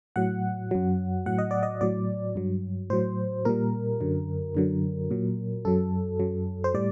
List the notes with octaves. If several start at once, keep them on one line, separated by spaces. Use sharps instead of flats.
A2 F#3 F#5
F#2 F#3
A2 F#3 F#5
D#5
D5
D#5
A2 F#3 D5
G2 F#3
A2 F#3 C5
A#2 G3 A#4
F#2 D3 F#3
F#2 D3 F#3
A#2 F#3
F#2 F#3 A4
F#2 F#3
C5
A2 G3 D5